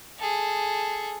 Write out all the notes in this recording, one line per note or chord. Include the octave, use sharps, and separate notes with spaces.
G#4 A4